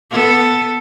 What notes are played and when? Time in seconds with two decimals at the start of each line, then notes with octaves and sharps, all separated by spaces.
0.11 B3 A4